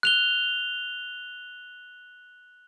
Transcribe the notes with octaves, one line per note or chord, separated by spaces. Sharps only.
F#6 F7 G7